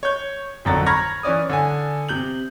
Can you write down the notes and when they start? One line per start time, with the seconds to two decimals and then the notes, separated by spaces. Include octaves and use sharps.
0.03 C#5 G6
0.65 G#1 F2 D3 F#3 A#5 A6
0.86 A#5 B5 C#6 F6 G#6 A#6
1.23 E3 C#4 D5 D#6
1.49 D3 G#5
2.08 C3 G6 F#7